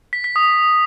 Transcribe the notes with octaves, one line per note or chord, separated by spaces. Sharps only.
B6
B6
D#6